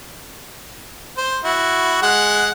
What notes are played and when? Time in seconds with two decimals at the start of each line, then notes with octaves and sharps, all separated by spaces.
1.17 C5
1.44 E4 F#4
2.02 G#3 F#5